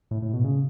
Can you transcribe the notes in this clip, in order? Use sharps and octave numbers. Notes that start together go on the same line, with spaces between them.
A2
A2
B2
C#3